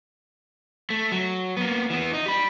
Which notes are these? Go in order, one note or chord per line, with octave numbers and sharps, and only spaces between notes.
A3
F#3
A#3 B3
E3 B3
D#4
G4 B5